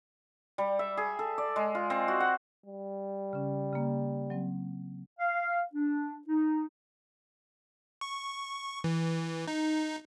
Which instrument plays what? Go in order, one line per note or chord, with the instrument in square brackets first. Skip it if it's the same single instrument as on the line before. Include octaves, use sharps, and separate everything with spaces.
[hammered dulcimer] G3
E5
G#4
A4
D5
G#3
F4
C4
F#4
F#5
[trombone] G3
[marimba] C#3 C#4
C#3 A#3
F#3 C4
[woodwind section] F5
D4
D#4
[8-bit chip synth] C#6
E3
D#4